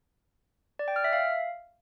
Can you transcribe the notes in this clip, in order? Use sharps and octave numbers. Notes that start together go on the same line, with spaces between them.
D5
G5
F6
E5
F5